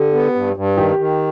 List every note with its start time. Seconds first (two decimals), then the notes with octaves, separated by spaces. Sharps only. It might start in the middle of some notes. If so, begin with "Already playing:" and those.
Already playing: D3 G4
0.14 B3
0.35 G2
0.56 G2
0.78 D#3 G4
0.99 D#3